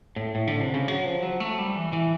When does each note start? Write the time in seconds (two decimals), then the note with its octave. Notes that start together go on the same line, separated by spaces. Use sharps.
0.16 A2
0.35 A2
0.47 D3
0.61 C3
0.74 C#3
0.88 F#3
1.05 F3
1.22 F#3
1.40 A3
1.59 G3
1.76 E3
1.93 E3